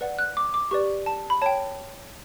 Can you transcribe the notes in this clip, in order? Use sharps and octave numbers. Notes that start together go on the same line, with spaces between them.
B4 D5 F#5
F#6
D6
D6
G4 B4 D5 C#6
A5
B5
C#5 G5 A5